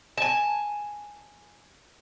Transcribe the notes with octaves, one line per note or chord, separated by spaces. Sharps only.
G#5 A5